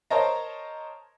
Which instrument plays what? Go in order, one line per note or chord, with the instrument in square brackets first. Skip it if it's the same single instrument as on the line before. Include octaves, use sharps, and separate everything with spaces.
[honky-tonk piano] A#4 C5 C#5 D#5 A5 A#5